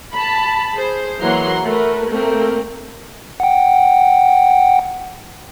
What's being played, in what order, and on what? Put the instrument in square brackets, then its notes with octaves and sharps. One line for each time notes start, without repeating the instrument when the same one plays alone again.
[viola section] A5 B5
G#4 C5
E3 F#3 A#3 F#5 A#5 C6
A3 A#4 B4
A3 A#3 C4 A#4
[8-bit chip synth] F#5 G5